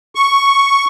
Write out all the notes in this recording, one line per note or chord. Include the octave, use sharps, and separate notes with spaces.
C#6